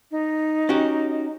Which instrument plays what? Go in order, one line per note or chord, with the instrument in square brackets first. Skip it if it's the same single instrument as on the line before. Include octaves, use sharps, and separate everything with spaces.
[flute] D#4
[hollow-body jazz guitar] C#4 F#4 G4